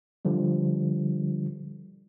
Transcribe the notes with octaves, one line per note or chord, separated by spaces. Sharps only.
D3 F3 G3